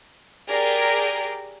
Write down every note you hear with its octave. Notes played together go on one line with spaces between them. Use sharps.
G4 G#4 A#4 D5